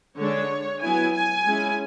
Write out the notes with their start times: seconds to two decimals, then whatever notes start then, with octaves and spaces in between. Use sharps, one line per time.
0.17 D3 G#3 D4 C#5
0.81 F#3 B3 E4 G#5
1.14 G#5
1.46 G#3 C#4 E4